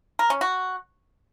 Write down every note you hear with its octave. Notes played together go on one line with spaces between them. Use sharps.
A#4
C#4
F#4